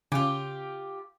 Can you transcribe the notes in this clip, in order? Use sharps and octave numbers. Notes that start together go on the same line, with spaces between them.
C#3 F4 G4